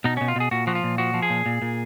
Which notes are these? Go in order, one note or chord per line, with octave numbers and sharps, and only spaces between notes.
B2 D#4
B2 C#4
F4
B2 G#4
A#2 F#4
F3 F#4
F4
A#2
F3 F#4
F3
G#4
A#2
A#2
A#2